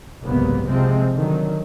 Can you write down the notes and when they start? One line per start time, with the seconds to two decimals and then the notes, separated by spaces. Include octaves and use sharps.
0.23 F#1 C2 G#2 C3 A#3 B3
0.65 C3 F3 G#3 C4
1.15 D3 D#3 F#3